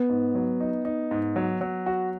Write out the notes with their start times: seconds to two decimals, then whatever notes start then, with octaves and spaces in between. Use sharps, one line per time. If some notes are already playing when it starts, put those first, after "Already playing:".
Already playing: B3
0.09 G#2
0.35 F#3
0.60 D#4
0.85 D#4
1.11 G#2
1.36 F#3
1.61 F#3
1.86 F#4